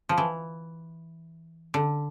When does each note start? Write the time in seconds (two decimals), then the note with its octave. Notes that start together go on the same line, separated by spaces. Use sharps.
0.09 F3
0.18 E3
1.74 D3